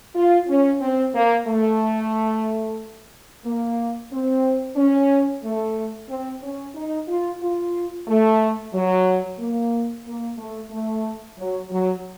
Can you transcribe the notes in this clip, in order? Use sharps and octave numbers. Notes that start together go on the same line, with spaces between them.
F4
C#4
C4
A#3
A3
A#3
C4
C#4
A3
C4
C#4
D#4
F4
F4
A3
F#3
A#3
A#3
A3
A3
F#3
F#3